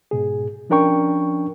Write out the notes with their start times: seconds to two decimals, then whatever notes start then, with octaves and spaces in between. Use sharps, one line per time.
0.11 G#2 B2 G#4
0.70 F3 C#4 D4 A#4 G5 C#6